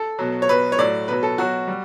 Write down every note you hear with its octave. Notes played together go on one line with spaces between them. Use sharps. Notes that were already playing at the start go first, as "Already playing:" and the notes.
Already playing: A4
B2 F#3
C#5
B2 F#3 B4
C#5
A2 F#3 D5
B2 F#3 B4
A4
B2 F#3 F#4
G3